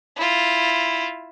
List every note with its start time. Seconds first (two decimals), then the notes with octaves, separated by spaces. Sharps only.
0.16 E4 F4